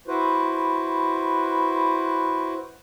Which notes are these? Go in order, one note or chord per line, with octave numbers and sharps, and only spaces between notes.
E4 F#4 B4 C5